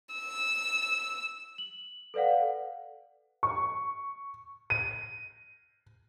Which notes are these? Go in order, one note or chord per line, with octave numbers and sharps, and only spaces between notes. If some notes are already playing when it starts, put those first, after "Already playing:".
E6
F#7
A4 B4 D5 F5 F#5
C#6
D#7